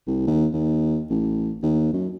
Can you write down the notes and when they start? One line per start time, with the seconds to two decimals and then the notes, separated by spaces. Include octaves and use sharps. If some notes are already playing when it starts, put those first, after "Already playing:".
0.07 C2
0.27 D#2
0.53 D#2
1.10 A1
1.63 D#2
1.93 F#2